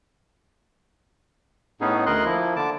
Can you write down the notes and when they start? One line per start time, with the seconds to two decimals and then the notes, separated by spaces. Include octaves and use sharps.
1.81 A2 B3 C#4 D#4 G#4
2.06 D2 A#4 D#5 C6 F#6
2.25 F3 A#3 E4
2.56 D3 A5 D6